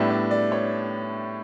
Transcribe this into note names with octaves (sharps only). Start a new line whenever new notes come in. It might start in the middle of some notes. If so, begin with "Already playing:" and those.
Already playing: A2 G3 B3 D4 E5
D5
D5
C#5